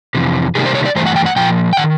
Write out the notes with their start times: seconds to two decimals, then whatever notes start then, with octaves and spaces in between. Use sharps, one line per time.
0.15 F2 C3 E3
0.55 C3 D#3 G3 A#3 G#4
0.66 C5
0.75 C#5
0.86 D5
0.96 G2 E3 A3 C5
1.06 F#5
1.16 G5
1.26 F#5
1.36 A#2 F3 G5
1.73 G5
1.77 D#3 F#5